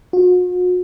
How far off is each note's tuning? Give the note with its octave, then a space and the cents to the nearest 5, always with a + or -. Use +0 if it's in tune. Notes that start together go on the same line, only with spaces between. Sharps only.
F#4 -40